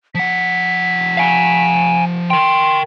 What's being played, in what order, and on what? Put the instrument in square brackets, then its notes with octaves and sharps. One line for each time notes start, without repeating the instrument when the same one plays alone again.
[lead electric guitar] F3 F#5 [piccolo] B6
[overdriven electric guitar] F5 G#5
[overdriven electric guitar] A#4 G5 [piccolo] C6